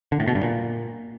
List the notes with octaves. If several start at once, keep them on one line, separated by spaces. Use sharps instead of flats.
D3
A2
B2
G2
A#2